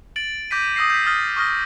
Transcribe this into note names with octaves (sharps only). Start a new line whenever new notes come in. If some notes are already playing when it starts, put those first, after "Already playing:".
A6 D7 F#7
D6 G6 A#6 B6 D#7
D#6 E6 A#6 C7
G6 B6
D#6 F6 A6
C#6 D#6 F6 A#6